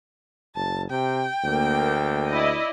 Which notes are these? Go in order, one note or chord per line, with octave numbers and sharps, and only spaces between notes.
F#1 A5
C3 G5
D2 A#3
E4 D5 D#5